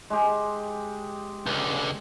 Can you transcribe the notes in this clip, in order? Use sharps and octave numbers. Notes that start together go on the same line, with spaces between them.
G#3 G4
C#2 D3